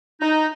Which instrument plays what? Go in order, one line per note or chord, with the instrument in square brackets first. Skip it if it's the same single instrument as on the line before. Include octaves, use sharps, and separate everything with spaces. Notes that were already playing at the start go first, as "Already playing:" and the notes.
[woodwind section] D#4